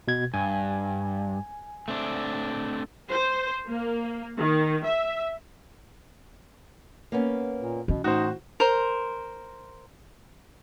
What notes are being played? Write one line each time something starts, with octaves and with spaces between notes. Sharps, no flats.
B2 G#6
G2 G#5
A3 C4 D4
C5
A#3
D#3
E5
A#3 B3 C#4
A#2
B2 E3 C#4
A2 D#4 F#4 C5
A#4 C5